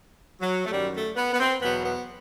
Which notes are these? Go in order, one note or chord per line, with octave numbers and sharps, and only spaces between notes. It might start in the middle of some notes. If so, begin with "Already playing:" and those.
F#3
A3
F#2 D#3 F#3 G3
A3
B3
B3
C4
E2 B2 F#3 B3
B3